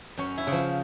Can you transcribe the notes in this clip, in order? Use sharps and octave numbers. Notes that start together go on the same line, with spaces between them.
F#2 C#4
E4
C#3
F3